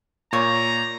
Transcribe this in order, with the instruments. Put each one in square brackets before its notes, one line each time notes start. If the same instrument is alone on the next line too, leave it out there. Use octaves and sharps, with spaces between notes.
[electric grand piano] A#2 [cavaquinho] C#5 D5 F5 [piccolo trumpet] A#5